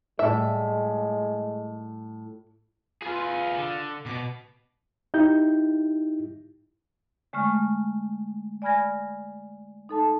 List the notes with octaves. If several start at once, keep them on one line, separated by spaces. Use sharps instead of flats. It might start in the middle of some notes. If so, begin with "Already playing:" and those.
A2 G3 G#3 E5
F4 G#4 B4
D3
B2 B3 D6
D#4 E4 G4 G6
D3 G#3 A3 C#6 F6
D5 G#5 B5 F6 G#6 A#6
D#4 A4 A5